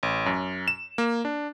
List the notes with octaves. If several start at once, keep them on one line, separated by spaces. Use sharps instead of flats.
A1
F#2
E7
A#3
D4